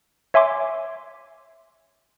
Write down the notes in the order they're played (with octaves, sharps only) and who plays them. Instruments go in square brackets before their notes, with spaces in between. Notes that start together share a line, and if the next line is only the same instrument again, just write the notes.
[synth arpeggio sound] C#5 E5 G#5 C6 D6